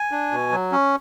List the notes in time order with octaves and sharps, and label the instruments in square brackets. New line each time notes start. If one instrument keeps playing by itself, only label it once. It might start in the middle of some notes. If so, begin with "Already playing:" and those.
Already playing: [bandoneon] G#5
D4
B2
F#3
C#4